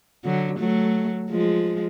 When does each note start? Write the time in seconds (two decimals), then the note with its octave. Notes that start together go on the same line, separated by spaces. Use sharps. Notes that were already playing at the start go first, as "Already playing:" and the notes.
0.24 D3 F#3
0.59 F#3 A3
1.30 F3 G#3